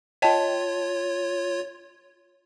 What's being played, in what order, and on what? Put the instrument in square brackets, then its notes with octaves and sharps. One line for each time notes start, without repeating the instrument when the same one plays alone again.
[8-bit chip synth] F4 C#5 [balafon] D#5 G5 A5